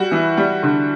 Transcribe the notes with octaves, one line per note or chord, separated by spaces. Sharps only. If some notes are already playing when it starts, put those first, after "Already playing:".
Already playing: G3 F#4
E3
G3
D3